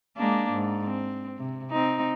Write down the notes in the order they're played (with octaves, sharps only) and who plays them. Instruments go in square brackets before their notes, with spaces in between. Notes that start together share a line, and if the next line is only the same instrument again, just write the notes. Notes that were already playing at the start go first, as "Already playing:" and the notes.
[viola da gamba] G#3 A#3 D4
G#2
C4
C3
C4 D#4